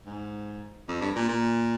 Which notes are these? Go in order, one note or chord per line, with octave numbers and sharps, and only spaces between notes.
G#2
F2
G2
A#2
A#2